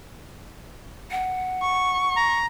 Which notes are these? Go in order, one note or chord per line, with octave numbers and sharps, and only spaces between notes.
F#5
C#6
A#5